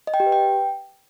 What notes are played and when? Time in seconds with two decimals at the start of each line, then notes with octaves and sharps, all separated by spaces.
0.07 D#5
0.14 G5
0.20 G4
0.26 B4
0.32 G5